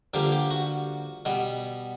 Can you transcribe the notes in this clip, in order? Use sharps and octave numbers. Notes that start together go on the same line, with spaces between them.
G2 D3 F3 A#3 G4
G4
F#4
B2 G3 B3